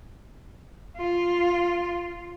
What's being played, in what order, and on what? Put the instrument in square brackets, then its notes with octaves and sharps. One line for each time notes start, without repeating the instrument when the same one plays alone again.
[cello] F4